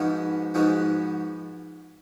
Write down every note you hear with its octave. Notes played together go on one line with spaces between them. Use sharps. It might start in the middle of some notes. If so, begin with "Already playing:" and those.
Already playing: G#2 F3 G#3 B3 F#4
G#2 F3 G#3 B3 F#4